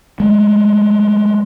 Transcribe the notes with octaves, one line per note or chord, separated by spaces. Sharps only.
G#3 A3